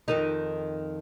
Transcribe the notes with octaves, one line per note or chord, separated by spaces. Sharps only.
F2 D#3 D#4